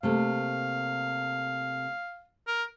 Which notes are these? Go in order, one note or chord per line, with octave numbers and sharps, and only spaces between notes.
C3 A3 A#3 F5
A#4